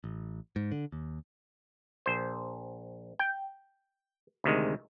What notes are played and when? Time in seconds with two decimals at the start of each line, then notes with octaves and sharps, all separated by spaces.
0.04 A1
0.56 G#2
0.72 D3
0.92 D#2
2.06 A#1 C5
3.19 G5
4.44 D2 C3 D#3 G#3